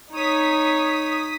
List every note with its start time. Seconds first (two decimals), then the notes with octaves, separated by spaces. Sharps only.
0.13 D#4 C#5 D#6 B6